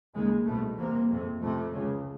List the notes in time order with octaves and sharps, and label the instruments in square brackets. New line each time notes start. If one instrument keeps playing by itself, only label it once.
[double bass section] D#2 C#3 G#3
C2 B2 A3
E2 C3 A#3
F2 C3
F2 C3 A3
C#2 C#3